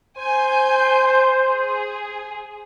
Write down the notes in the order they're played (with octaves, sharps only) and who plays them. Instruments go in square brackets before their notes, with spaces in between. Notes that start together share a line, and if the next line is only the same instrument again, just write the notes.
[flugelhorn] C5 [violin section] G#5 G6
[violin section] G#4